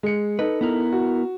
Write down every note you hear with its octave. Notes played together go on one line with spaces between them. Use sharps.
G#3 C#7
D#4 A4 B4
B3 E4 A#4
F#4